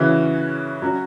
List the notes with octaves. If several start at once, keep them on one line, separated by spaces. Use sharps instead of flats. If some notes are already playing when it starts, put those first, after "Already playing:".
Already playing: C#3 E3 C#4 F#4
F#3 C#4 F#4